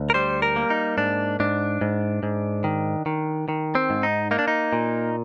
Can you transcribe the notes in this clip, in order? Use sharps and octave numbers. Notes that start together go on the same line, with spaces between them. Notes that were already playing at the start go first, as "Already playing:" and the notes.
Already playing: D2
A#4
G3 C5
A#4
A#3
D#4
G#2 D4
G#2 D4
G#2
G#2
D#3
D#3
D#3
C4
G#2
D#4
A#3 D#4
D4
D#4
A#2